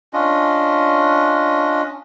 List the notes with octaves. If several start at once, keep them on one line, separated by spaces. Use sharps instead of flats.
C#4 D4 F4 D#5